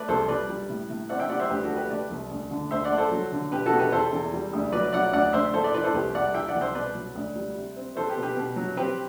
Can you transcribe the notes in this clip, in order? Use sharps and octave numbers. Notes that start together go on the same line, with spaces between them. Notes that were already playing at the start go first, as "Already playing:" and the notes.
Already playing: A3 B4 D5
C2 A4 C5
G3 B4 D5
G3
A2
A2
C4 D5 F#5
E5 G5
G3 D5 F#5
C5 E5
D2 G4 B4
F#4 A4
B3
G4 B4
A3 B4 D5
C2
D2
D3
D2 C5 E5
D5 F#5
A3
A4 C5
F#3
D3
B2 G4 B4
F#4 A4
B2
G4 B4
E2 A4 C5
E2
G3
D2
F#3 B4 D5
F#3 D5 F#5
D2 D5 F#5
D2 C5 E5
A2 A4 C5
B4 D5
E3 B4 D5
A4 C5
C2 G4 B4
G3 D5 F#5
E3 E5 G5
D5 F#5
C2
C5 E5
B2 B4 D5
F#3
D2
G3
C3
C4
B3 A4 C5
G4 B4
B2
G4 B4
B2
F#3
C4 G4 B4